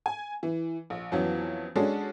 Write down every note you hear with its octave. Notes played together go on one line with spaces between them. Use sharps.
G#5
E3
A#1
F2 E3 F#3 B3 C#4
G#3 C#4 D4 F#4 A4